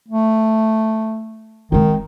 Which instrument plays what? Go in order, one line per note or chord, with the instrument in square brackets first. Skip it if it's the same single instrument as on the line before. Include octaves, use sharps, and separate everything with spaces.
[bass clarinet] A3
[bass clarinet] D#3 [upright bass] G#3 C4